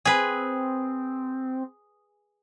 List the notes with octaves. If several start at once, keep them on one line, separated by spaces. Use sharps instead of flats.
C4 G#4 B4